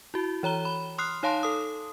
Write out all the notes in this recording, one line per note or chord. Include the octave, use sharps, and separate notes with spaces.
E4 F#4
E3 C#5 A#5 G7
B5
C6 D#6 F6 F#6 C7
D#4 C#5 F5 A5 C6
A4 D#6